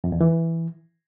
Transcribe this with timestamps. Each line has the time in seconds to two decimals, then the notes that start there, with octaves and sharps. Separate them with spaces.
0.04 F2
0.12 E2
0.21 E3